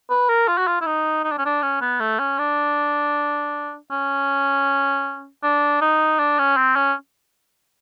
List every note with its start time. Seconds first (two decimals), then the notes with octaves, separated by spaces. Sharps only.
0.10 B4
0.29 A#4
0.48 F4
0.58 F#4
0.67 F4
0.81 E4
0.86 D#4
1.24 D#4
1.31 D4
1.38 C#4
1.45 D4
1.62 C#4
1.81 B3
2.00 A3
2.19 C#4
2.39 D4
3.91 C#4
5.43 D4
5.81 D#4
6.19 D4
6.39 C#4
6.57 C4
6.76 C#4